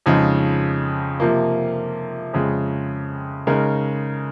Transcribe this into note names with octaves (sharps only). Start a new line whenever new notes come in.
F2 C#3 F3 G#3 D#4
C3 F3 A#3
F2 C#3 G#3
C#3 G#3 D#4 A#4